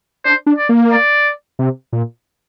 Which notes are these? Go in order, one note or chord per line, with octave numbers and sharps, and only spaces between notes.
D4 C5
D4
D5
A#3
D5
C3
A#2